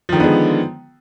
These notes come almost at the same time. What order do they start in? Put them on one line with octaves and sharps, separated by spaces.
F3 D#3 D3 B3 G#3